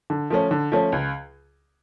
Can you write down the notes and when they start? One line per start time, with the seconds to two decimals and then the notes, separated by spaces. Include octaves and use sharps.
0.10 D3
0.30 F3 A3 C#4
0.51 D3
0.72 F3 A3 C#4
0.92 C#2